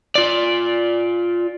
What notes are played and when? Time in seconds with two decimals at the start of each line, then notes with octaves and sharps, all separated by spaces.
0.15 F4 D5